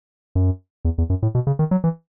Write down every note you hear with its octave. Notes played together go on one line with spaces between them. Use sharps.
F#2
E2
E2
F#2
A2
B2
C#3
D#3
F#3
E3